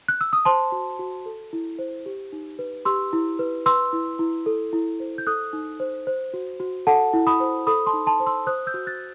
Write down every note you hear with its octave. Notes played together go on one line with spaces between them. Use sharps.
F#6
E6
D#6
C5 A5 C6
F#4
F#4
A4
E4
C5
G4
D#4
B4
G4 C6 E6
E4
B4
B4 C6 E6
E4
E4
A4
E4
C5
G6
A4 D#6 F#6
D#4
C5
C5
F#4
F#4
A4 F#5 A5
E4
B5 D#6
C5
A4 B5 D#6
A5 C6
D#4
A5 C6
C5
C6 E6
C5 D#6 F#6
E6 G6
F#4
F#6 A6